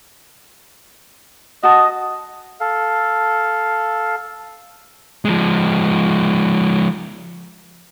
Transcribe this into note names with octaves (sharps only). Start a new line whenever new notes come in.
F#4 D#5 A5
A4 F5
F3 G#3